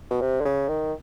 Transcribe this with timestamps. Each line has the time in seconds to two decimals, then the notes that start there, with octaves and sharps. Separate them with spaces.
0.10 B2
0.21 C3
0.41 D3
0.45 C#3
0.68 D#3